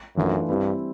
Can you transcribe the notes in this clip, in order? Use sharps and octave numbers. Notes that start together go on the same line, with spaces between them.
F#2 E3 A3 D4 F4
G2 G3 C4 E4